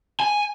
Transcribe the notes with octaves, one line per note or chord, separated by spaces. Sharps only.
G#5